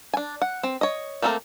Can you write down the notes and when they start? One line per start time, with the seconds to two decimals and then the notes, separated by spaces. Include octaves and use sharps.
0.14 D4 G#5
0.42 F#5
0.63 C4
0.81 C#5 D#5
1.22 A3 A#3 C4 A4 A#4